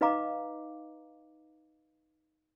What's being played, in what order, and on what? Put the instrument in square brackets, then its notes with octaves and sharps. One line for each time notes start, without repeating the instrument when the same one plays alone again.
[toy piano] D#4 B4 D#5 F5 A#5 D6